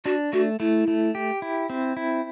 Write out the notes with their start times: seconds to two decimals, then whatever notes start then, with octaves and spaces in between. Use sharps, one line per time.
0.05 D4 F#4
0.33 A3 F#4
0.60 A3 E4
0.88 A3
1.15 G4
1.42 E4
1.70 C4
1.97 E4